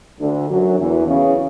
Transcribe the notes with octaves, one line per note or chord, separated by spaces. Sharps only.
D2 D3
F#2 F#3
E2 E3
C#3